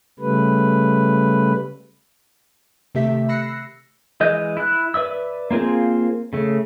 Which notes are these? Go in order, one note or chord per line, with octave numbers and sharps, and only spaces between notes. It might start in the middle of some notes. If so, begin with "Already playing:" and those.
C#3 G3 A3 B4
C3 D#3 A3 G4 E5 B6
B5 E6 F#6 A#6 C7 C#7
E3 G#3 D#5 G6
E4 F#6
B4 D5 E5 E6
A#3 C4 F4 G#4 C5
C#3 A3